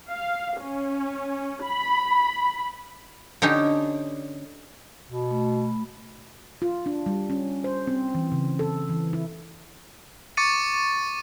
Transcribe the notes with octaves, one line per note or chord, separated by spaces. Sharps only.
F5
C#4
B5
D3 C#4 D#4 G4
B2
A3 B5
F4
D4
G3
C#4
C5
C4
E3
C#3
A4
E3
E4
C#6 D6 A6 C#7 D#7